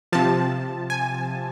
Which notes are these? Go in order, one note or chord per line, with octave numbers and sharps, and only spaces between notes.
C3 F3 A5
G#5